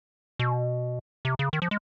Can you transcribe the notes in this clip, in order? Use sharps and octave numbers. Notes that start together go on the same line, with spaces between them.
B2
C3
C#3
D#3
F3
G#3